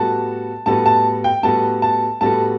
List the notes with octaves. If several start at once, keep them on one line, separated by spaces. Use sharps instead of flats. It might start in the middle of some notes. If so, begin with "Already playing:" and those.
Already playing: A2 G3 B3 F#4 A4 A5
A2 G3 B3 F#4 A4 A5
A5
G5
A2 G3 B3 F#4 A4 A5
A5
A2 G3 B3 F#4 A4 A5